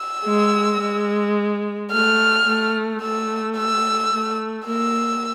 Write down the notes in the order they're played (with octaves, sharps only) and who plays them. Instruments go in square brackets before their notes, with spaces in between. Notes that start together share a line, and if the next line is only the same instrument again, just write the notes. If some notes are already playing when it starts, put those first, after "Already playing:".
Already playing: [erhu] E6
[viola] G#3
G#3
[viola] A3 [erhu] F6
[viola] A3
[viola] A3 [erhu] E6
[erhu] E6
[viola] A3
[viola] A#3 [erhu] E6